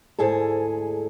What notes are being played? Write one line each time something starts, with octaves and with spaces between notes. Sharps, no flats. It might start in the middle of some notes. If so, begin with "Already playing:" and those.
D2 G#2 E4 G#4 A4